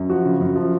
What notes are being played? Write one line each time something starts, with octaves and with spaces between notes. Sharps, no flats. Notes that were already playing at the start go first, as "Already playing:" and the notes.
Already playing: F#2
F3 F#4
C#3
F#2
F3